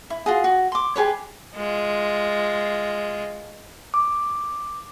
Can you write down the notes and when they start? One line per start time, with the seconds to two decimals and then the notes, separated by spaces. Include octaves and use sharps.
0.10 E4
0.26 F4 F#4 G#4
0.44 F#4
0.72 C6 D6
0.96 G4 G#4 B4 C#5
1.56 G#3 F4
3.94 D6